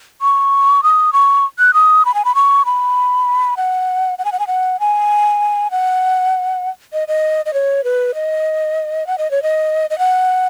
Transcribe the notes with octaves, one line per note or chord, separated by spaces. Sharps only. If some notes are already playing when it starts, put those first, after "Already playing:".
C#6
D#6
C#6
F#6
D#6
B5
G#5
B5
C#6
B5
F#5
F#5
G#5
F#5
G#5
F#5
G#5
F#5
D#5
D#5
D#5
C#5
B4
D#5
F#5
D#5
C#5
D#5
D#5
F#5